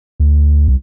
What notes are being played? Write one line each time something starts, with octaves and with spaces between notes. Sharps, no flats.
D2
C2